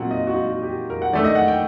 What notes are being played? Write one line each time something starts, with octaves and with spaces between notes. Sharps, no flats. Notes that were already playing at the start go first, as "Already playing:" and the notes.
Already playing: A#2 F#3 C4 D#4 F#5
D#5
F#4
D#4
F#4
G4
A#4
F#5
D#3 A3 D4 D5
D#5
F#5
G5